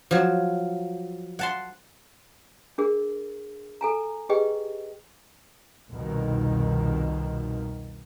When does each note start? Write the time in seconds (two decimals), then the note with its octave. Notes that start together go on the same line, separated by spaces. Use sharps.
0.11 F3 F#3
1.39 F#5 A5 C6
2.78 D4 G#4 A#4
3.81 A4 G#5 A#5
4.29 G4 G#4 B4 D#5 G5
5.91 C2 F2 B2 D#3